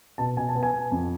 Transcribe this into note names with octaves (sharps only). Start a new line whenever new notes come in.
B2 A5
B2 G#5
A5
B3
G#5
B3
F2